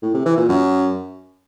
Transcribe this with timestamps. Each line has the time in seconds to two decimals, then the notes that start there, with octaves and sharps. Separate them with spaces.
0.03 A2
0.14 C3
0.26 E3
0.37 A#2
0.49 F#2